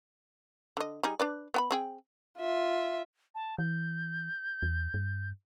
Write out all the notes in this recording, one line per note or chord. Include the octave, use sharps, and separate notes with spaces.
D3 D#5
G3 D#4 G#4
D4 B4 D5
B3 G5 B5
C4 G#4 G5
F4 E5
A5
E3 G6
E2
G2